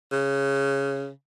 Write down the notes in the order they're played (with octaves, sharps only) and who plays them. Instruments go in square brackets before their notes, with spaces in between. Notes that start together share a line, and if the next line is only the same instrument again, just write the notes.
[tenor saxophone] C#3